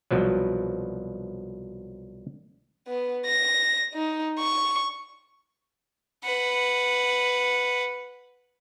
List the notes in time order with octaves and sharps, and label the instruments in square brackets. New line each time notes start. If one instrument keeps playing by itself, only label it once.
[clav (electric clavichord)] C2 B2 F3 F#3
[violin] B3
A#6
D#4
C#6
[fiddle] B4 F#5